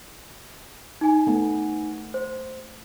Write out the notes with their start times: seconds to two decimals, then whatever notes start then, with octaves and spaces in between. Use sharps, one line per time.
1.01 D#4 G#5
1.27 A3 B3
2.14 C5